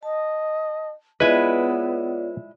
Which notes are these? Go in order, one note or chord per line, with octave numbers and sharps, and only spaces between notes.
D#5 A5
G#3 B3 E4 F4 B4 C#5 D5 G#5